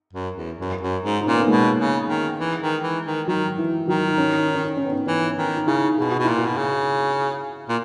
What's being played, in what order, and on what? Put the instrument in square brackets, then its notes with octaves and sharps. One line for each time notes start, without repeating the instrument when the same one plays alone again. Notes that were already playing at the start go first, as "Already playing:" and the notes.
[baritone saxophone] F#2
E2
F#2
F#2
G#2
[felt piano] D#4
[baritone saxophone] A#2 [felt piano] C#4
[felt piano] B3
A#3
[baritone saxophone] B2 [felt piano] G#3
[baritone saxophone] C#3
D#3
E3
D#3
E3
D#3
[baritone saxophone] D#3 [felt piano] F#3
[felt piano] E3
[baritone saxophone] D#3 [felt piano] F#3
[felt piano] D#4
C#4
D#4
C#4
D#4
C#4
B3
C#4
[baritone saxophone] E3 [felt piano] C#4
[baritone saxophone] D#3 [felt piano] D#4
[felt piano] D#4
[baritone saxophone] C#3 [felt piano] E4
[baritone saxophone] B2 [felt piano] G#4
[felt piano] F#4
[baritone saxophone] B2
[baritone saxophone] A#2 [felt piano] E4
[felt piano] F#4
[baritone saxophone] B2
C#3
A#2